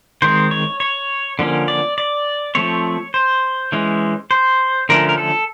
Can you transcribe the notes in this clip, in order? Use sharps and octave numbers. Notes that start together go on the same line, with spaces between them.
D#3 G#3 C4 C5
C#5
C#5
D3 F3 A#3 C#4
D5
D5
F3 A3 C4 C#5
C5
E3 G#3 C#4
C5
D3 F3 A3 C#4 A#4
A#4
A4